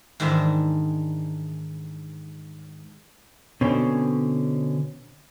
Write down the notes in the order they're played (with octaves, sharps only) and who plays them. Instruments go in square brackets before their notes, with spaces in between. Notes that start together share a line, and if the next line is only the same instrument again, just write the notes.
[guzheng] G#2 D#3 E3 D4 E4
[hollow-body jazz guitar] B2 D3 C4 C#4